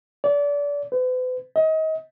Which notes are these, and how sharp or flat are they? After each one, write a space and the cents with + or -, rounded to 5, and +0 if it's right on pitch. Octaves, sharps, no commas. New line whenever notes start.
D5 -30
B4 +45
D#5 +30